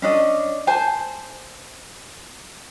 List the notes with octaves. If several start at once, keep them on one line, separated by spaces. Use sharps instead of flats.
C#4 D4 D#5
C5 G#5 A5